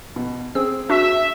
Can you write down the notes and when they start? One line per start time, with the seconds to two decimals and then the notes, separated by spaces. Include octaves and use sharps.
0.16 B2
0.55 C4 G#4 E6
0.90 D4 F#4 E5 B6